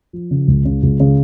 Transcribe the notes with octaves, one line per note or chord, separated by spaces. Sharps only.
F3
C#3
C#2
C#3
C#2
C#3